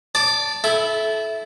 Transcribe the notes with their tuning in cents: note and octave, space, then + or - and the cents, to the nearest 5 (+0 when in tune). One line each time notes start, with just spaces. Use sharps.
D5 -20 A5 +0 D6 +25
E4 +0 A4 -25